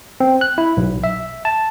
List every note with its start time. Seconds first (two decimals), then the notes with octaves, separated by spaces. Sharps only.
0.20 C4
0.41 F#6
0.58 E4
0.77 B1
1.04 E5
1.45 A5